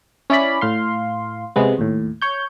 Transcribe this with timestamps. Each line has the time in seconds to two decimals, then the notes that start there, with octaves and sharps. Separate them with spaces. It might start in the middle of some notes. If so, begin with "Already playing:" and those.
0.30 C#4 E4 D5 B5
0.61 A2 F5 C6
1.56 C3 G#3 B3
1.78 D#2 A2
2.21 C#5 G6